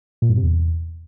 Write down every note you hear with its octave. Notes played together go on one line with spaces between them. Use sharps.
A#2
G2
C3
E2